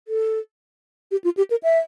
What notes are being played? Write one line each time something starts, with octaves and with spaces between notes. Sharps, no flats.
A4
G4
F4
G4
A#4
E5